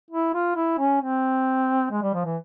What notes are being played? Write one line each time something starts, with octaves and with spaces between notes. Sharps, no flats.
E4
F4
E4
C#4
C4
G#3
G3
F3
E3